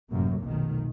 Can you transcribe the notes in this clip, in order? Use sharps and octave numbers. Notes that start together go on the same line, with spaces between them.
A1 F#2 C3 A#3
F1 B1 D#3